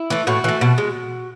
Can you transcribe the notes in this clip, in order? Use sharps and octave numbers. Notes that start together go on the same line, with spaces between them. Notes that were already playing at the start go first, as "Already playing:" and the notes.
Already playing: E4
E3 A3
A2 F#4
E3 A3
B2
G#3